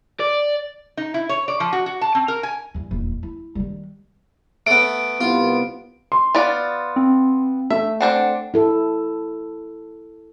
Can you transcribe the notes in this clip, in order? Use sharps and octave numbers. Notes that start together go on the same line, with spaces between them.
D5
D#4
E4
C#5
D5
F3
F#4
F#4
A5
C4
A#4
G#5
E2 G2
D#1 E2
E4
D#3 G3
A3 B3 D7
C2 B3 F4
C6
B3 F4 D5
C4
A3 E5
C4 D4 C5 F#5
E4 A4